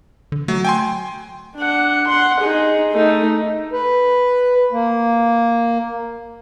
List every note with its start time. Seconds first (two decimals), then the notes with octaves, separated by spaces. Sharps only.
0.32 D3
0.48 F#3 A3
0.65 G5 G#5 C6
1.56 D4 F#5
2.07 F#5 C6
2.40 D#4 G#4
2.93 A3 D#4
3.73 B4
4.72 A#3